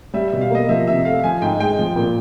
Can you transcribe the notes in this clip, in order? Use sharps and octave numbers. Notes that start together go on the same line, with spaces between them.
G3 E5
E5
B2
F5
A#3 D#5
F3 E5
C3 E5
A3 F5
F3 G#5
G#2 G5
G#3 G5
F3
A#2